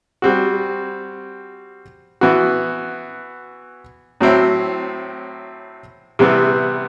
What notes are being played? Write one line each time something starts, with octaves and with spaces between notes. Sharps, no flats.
G3 C4 F#4
E3 B3 F#4
A2 F#3 C4 E4
C3 E3 G3 B3